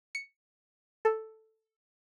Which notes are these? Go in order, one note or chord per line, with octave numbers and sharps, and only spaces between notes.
C#7
A4